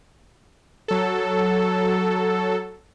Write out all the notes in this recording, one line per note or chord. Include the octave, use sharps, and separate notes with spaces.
F#3 A4